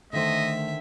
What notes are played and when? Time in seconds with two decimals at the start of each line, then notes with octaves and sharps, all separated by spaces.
0.13 D3 D#3 A3 C5 D#5 E5